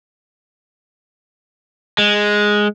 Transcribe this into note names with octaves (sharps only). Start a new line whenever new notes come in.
G#3